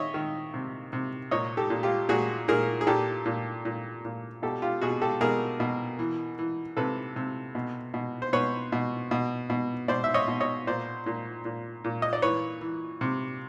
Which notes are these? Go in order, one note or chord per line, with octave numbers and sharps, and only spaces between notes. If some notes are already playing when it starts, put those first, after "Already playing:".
Already playing: D#3 C#5 D#5 E5
D#3
C3
C3
A#2 C#5 D#5
G4 A4
A#2
F4 G4
A#2 F#4 G#4
A#2 G#4 A#4
G#4
A#2 G4 A4
A#2
A#2
A#2
B2 G4 A4
F4 G4
B2 F#4 G#4
G4 A4
B2 G#4 A#4
B2
E3
E3
C3 A4 B4
C3
B2
B2
C5
B2 B4 C#5
B2
B2
B2
B2 C5 D5
E5
C#5 D#5
B2
C#5 D#5
A#2 C5 D5
A#2
A#2
A#2
D#5
D5
E3 B4 C#5
E3
C3